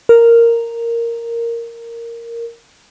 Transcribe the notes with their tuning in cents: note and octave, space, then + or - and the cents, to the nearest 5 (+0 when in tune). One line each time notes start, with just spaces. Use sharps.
A#4 -5